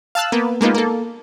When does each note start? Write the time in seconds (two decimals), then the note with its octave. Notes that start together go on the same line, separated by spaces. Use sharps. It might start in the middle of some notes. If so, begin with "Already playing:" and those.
0.15 F5 A5 E6 F#6
0.32 A#3 B3
0.61 G#3 A#3 B3 D#4 F4
0.75 A#3 A4